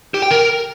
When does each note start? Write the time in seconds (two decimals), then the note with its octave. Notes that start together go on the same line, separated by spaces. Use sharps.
0.14 G4
0.22 G5
0.31 A#4